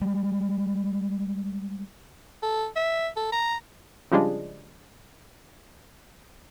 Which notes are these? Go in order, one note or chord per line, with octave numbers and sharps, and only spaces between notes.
G3 G#3
A4
E5
A4
A#5
C#3 F3 G3 G#3 D4